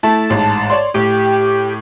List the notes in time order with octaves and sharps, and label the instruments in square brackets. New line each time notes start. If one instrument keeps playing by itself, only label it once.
[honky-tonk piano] A3 E4 [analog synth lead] A5
[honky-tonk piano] A1 G#2
C#5 D5 C6
[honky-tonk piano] A2 [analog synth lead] G4